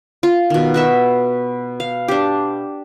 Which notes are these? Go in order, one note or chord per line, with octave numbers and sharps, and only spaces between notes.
F4
B2 D#3
F#4 B4 E5
F5
D4 G4